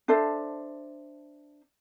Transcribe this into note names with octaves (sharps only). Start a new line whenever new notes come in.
D4 A4 C5 E5